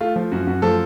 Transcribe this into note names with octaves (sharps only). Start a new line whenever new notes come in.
A3 F4
F3
F#2 F#4
F#2 F#4
F3 A3 A4